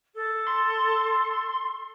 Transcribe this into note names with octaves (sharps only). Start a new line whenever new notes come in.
A4
C6